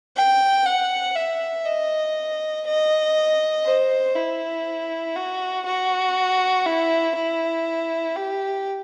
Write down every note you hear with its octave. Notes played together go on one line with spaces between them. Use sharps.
G5
F#5
E5
D#5
D#5
C5
E4
F#4
F#4
E4
E4
G4